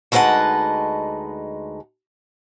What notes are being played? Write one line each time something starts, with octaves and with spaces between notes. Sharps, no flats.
D2 G#3 D#4 B4 F#5 A5